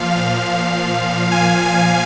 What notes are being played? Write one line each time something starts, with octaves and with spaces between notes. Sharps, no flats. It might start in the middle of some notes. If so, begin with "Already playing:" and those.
Already playing: A#2 F3 F5
G#5